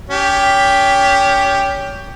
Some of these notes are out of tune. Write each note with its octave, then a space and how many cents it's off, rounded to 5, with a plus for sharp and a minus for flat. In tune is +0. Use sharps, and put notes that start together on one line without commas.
C#4 +30 G4 +5